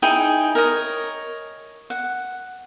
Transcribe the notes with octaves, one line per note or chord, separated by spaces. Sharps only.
D#4 E4 G#4 G5
A#4 C#5 D#5
F#5